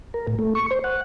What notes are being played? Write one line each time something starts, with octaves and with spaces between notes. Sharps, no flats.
A#4
A2
A3
C#6
C5
F#5